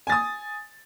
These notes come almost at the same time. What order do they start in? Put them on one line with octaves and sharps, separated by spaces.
G#5 A6 D#6